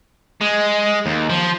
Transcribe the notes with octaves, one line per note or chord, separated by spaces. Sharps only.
G#3
D#2
F3